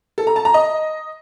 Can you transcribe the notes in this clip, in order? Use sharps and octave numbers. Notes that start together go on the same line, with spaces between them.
A4
A#5
A5
A#5
D#5